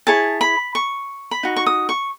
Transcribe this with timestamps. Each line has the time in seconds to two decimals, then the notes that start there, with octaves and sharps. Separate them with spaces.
0.07 E4 G#4 C#5 A5
0.41 B5
0.75 C#6
1.31 B5
1.43 D#4 F#4
1.56 C#6
1.66 D#6
1.89 C#6